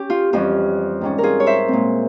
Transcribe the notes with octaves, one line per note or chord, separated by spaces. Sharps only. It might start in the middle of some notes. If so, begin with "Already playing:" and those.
Already playing: C#4 G4
F4
F2 E3 G3 C#4 F4
G#2 G3 C#4
F4 G#4 A#4
C#5
C5 E5
A#2 G#3 C4